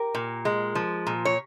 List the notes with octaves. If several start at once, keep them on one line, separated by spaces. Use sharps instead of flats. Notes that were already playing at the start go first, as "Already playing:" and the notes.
Already playing: G4 A#4
A#2
G#3
F3
A#2
C#5